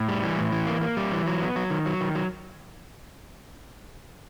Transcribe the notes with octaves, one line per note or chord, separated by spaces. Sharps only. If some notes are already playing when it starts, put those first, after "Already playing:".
Already playing: A2
G3
E3
A2
E3
A#3
A#3
G3
E3
F#3
B3
F#3
D#3
F#3
D#3
F#3